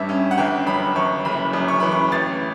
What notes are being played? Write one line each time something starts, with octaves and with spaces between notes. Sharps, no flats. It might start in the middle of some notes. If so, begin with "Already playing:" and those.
Already playing: A1 G2 E5
C#4
F#5
G1 G5
F#2 B5
G1 C#6
F#1 B5
F#2
C#6
E3 B5
C#6
A1 A6